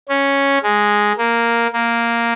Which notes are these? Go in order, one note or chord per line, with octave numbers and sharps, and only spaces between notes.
C#4
G#3
A#3
A#3